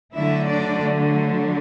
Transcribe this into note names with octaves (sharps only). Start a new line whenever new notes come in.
D3 F#3 A3 E4 E5
D4 D5